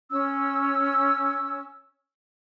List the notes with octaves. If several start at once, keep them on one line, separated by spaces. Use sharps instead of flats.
C#4 E6